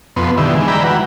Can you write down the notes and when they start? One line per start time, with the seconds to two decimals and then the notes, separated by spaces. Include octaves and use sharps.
0.16 F2 B2 B3 C6
0.37 D3 D#3 G3 E4
0.55 E3 G#3
0.68 B4 D5 E5 G5 A#5 B5
0.83 E3 F#4